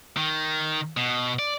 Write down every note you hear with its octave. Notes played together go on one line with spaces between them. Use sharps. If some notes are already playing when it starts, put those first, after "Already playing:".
D#3
B2
D5